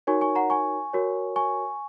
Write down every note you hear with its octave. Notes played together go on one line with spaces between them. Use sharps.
D#4 F#4 A#4 C#5 G#5 C#6
G#5 C#6
F#5 A#5
G#5 C#6
F#4 A#4 C#5
G#5 C#6